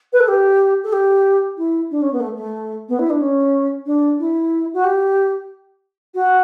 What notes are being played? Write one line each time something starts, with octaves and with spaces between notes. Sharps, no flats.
B4
A4
G4
A4
G4
E4
D4
C#4
B3
A3
A3
B3
E4
D4
C#4
D4
E4
F#4
G4
F#4